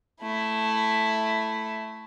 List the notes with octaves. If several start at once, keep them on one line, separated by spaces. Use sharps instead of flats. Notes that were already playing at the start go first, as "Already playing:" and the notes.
A3 E4